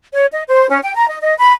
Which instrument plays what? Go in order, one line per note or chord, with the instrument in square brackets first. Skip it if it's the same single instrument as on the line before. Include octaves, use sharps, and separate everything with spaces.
[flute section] C#5
D#5
C5
C#4
G5
A#5
D#5
D#5
B5